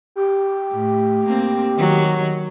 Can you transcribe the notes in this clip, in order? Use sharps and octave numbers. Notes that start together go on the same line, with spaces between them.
G4
A2
A#3 C4
D#3 F#3